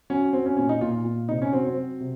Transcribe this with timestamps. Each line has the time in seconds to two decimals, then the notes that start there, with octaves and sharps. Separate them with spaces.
0.10 F#3 C#4
0.33 F#3 C4
0.46 C#4
0.57 A#2 C#4
0.69 D#4
0.81 A#2 F4
1.05 A#2
1.29 C3 D#4
1.42 C#4
1.53 F#3 C4
1.65 C4
1.77 F#3
2.00 C3